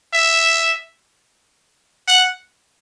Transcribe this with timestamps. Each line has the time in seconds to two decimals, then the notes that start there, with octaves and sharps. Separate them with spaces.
0.13 E5
2.08 F#5